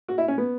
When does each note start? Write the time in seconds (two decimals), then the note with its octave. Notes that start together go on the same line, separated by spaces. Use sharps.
0.08 F#4
0.18 E4
0.28 C#4
0.38 B3